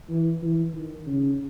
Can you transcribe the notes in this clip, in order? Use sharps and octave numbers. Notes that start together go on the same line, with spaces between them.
E3
E3
D#3
C#3